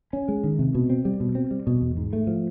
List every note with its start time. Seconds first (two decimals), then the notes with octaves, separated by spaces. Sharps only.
0.13 C#4
0.28 G#3
0.44 D#3
0.59 C3
0.75 B2
0.90 C4
1.05 G3
1.20 B2
1.35 C4
1.51 G3
1.67 B2
1.81 E2
1.97 G#2
2.13 A3
2.27 F3